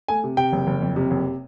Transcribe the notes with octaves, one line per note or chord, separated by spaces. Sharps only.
A3 G#5
C3
C3 G5
F#1
F#1
F2
C3
F#1